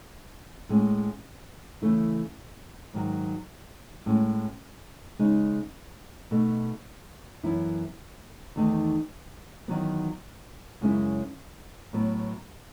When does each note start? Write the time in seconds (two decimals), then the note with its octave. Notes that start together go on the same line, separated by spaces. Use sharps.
0.69 A2 G#3 C#4
1.82 C#3 E3 A3 E4
2.93 G#2 D#3 F#3
4.06 A2 G#3 C#4
5.19 C#3 G#3 D#4
6.31 B2 A3 D#4
7.43 F#2 E3 B3 E4
8.56 E2 D#3 A3 D#4
9.68 E2 D#3 F#3 B3
10.81 F#2 C#3 G#3 C#4 E4
11.93 A2 F#3 B3